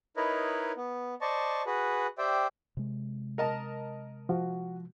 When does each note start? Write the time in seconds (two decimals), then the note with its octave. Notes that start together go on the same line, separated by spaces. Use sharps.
0.17 D#4 E4 A#4 B4 C#5 D#5
0.77 B3
1.21 C5 D5 D#5 A5 C#6
1.66 F#4 G#4 B4
2.18 G4 C5 D5 E5 G5
2.77 C3 G#3
3.38 A#4 D#5 A5
4.29 F3 F#4